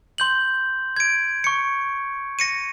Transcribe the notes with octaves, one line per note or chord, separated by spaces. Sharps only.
C6 G6 F#7
G#6 D7
C#6 C#7
A#6 C#7 D#7